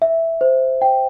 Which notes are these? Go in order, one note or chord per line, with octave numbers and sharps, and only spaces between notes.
E5
C5
G5